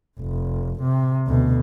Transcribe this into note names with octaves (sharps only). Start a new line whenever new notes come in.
F1
C3
D2 B2